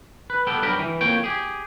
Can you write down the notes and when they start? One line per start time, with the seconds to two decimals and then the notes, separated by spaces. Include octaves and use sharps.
0.30 B4
0.47 G3 B3 A4 G5
0.62 G2 F#3 G4 A#4 G5 B5
0.79 E3
1.01 F2 A#3 C#5 G5
1.24 G4 G#4